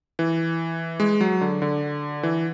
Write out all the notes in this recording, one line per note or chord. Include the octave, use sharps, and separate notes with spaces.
E3
G#3
F#3
D3
D3
E3